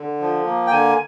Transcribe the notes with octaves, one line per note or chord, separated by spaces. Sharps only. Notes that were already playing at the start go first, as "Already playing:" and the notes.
Already playing: D3
F3
A#3
G5
D3 G#5